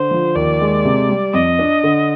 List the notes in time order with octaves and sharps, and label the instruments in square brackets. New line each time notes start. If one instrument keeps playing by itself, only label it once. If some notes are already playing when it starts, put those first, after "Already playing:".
Already playing: [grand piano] D3 [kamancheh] C5
[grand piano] F3
[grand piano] D#2 [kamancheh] D5
[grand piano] G#3
C3
G3
[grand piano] F2 [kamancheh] D#5
[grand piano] D4
D3